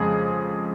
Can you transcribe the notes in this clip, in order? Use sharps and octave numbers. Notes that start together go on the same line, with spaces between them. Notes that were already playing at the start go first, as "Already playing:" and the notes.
Already playing: F2 C#3 F3 G#3 G#4